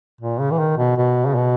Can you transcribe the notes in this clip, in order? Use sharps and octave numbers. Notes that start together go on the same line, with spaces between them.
A#2
C#3
E3
D#3
B2
B2
C#3
B2